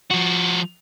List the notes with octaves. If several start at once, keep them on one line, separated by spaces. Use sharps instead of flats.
F3 F#4